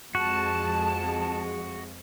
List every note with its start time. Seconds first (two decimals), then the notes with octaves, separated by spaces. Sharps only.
0.15 F2 G#3 F#4 A5